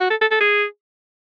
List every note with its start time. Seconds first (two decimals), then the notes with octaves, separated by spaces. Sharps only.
0.01 F#4
0.10 A4
0.21 A4
0.31 A4
0.40 G#4